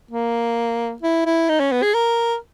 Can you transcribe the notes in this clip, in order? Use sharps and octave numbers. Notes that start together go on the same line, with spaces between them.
A#3
E4
E4
D#4
C#4
B3
G#4
A#4